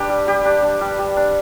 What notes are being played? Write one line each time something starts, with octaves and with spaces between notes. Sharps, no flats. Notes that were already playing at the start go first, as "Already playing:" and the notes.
Already playing: D4 G4 B4 B5
G3
G3 G4
D4
D4
G3
G3
D4